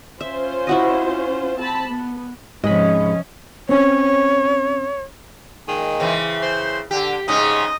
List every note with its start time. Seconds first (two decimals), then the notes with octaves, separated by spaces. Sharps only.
0.21 C#4 F4 C5 E5
0.67 E4 F#4 D#5
1.58 C4 A5 B5
1.89 B3
2.64 G#2 C3 F3 G#3 C#4 D#5 B5
3.69 C4 C#4 C#5
5.68 A#2 D#3 G#3
6.00 C#3 E3 C4
6.41 C5
6.91 D3 G4
7.28 G#2 C#3 C#4 D#4 D#5